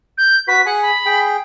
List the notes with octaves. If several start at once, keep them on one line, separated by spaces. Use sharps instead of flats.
G6
F#4 B4 B6
G#4 F#5 G#5
B5
G#4 G5